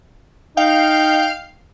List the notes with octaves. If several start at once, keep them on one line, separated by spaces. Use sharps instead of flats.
D#4 F5 G5